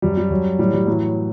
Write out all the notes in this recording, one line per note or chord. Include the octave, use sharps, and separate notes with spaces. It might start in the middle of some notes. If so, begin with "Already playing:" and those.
F#2 F#3 G3
G3
F#2 F#3
A2 F#3 G3
G3
A2 E3 F#3